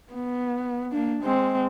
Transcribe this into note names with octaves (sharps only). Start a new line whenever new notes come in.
B3
A#3 D4
G#3 C4